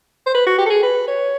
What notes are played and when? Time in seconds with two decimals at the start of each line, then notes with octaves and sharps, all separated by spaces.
0.27 C5
0.35 B4
0.47 F#4
0.58 G4
0.66 A4
0.70 G#4
0.83 B4
1.08 C#5